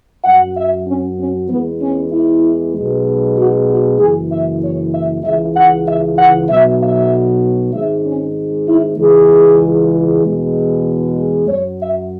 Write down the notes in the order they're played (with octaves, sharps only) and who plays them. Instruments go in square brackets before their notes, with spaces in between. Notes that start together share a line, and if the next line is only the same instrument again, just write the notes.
[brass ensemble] F#2 F#3 F#5
E5
C#4
C#4
E2 E3 G#3 B3
C#4
E4
B1 B2 G#3
F#4
F#4
F#1 F#2 E3 G#4
E5
C#5
E5
C#2 C#3 E3 E5
F#5
E5
F#5
B1 B2 F#3 E5
E5
G#1 G#2 G#3 E5
C#4
E4
C#2 C#3 E3 G#3 G#4
E2 B2 G#3
F#2 F#3 C#5
E5